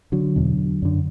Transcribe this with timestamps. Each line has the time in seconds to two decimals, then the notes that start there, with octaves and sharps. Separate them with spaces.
0.12 D3 F#3
0.36 E2 B2
0.82 F#2 D3